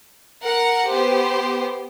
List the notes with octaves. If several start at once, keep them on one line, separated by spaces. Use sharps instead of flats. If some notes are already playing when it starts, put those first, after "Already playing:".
A#4 F#5
B3 G4 C5